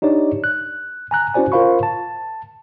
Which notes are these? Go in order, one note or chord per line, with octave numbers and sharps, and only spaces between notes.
D4 D#4 G4 C#5 D5
F#6
G#5 A#5 F#6
C#4 E4 F#4 C5 D5 G#5
F4 A#4 C5 F5 B5 C#6
A5